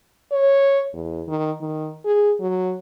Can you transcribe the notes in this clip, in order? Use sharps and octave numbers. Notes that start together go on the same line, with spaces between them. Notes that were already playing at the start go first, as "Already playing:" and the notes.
C#5
E2
D#3
D#3
G#4
F#3